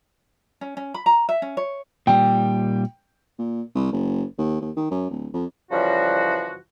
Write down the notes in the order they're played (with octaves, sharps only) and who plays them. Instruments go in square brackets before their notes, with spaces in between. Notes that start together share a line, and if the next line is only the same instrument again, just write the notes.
[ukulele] C#4
C#4
B5
A#5
E5
C#4
C#5
[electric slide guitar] A#2 G3 [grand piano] G5
[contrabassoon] A#2
C2
F#1
D#2
D#2
D#3
F#2
D1
F2
[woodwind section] F#2 C#3 E3 F3 G3 F#4